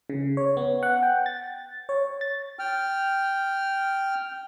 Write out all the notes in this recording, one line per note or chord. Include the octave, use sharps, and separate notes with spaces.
C#3
C#5
B3
F#5
G5
A6
C#5
A6
G5 F6